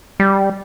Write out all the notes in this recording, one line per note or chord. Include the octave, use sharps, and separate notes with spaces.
G3